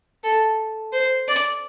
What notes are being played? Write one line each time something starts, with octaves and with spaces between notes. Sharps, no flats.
A4
C5
D5